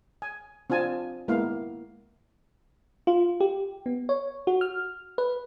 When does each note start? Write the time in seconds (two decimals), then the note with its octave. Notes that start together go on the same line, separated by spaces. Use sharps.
0.22 G#5
0.70 C4 D4 F4 G#5 A5
1.28 G#3 A#3 B3 E4 F5
3.07 F4
3.40 G4
3.86 B3
4.09 C#5
4.47 F#4
4.61 F6
5.18 B4